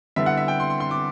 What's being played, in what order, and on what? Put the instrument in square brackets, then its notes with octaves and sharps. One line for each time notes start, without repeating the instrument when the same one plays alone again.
[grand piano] D3 G3 B3 E4 E5
F#5
E5
G5
C6
C6
C6
D6